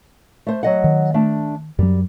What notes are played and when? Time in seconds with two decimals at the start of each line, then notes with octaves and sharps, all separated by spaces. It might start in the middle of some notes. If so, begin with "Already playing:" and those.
0.47 A3 C5
0.63 F#3 D#5 F#5
0.84 D#3
1.14 A3 D4
1.79 F#2 F#3 G3